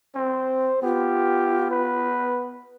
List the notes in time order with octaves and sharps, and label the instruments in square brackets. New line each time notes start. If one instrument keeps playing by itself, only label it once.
[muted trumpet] C4 [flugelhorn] C5
[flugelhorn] B3 [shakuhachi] F4 [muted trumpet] G4
[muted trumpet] B4